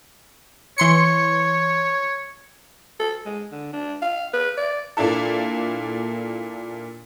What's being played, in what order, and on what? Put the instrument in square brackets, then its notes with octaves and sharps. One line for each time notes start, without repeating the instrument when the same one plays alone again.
[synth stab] E3 C6 C#7 [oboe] C#5
[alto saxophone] A4
G#3
D3
D4
F5
B4
D5
[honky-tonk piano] A#2 A#3 D4 E4 A4